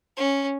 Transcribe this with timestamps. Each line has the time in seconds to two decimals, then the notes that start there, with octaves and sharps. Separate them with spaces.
0.17 C#4